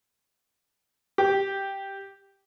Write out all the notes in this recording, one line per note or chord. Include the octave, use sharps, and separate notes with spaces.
G4